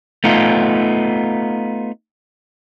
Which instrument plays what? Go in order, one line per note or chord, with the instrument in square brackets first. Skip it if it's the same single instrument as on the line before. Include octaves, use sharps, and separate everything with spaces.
[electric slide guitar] A3 B3 D#4 F4